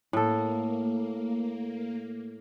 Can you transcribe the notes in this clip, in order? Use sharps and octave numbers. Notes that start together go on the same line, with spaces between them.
A2 A#3 A4